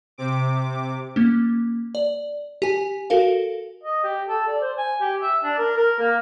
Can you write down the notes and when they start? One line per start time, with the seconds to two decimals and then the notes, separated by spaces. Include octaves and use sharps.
0.18 C3 D6
1.16 A#3 C#4
1.95 D5
2.62 G4 G#5
3.10 F#4 A4 A#4 F5
3.84 D#5
4.04 G4
4.28 A4
4.48 D5
4.61 C5
4.78 G#5
5.01 G4
5.22 E5
5.43 D4
5.58 A#4
5.77 A#4
5.99 A#3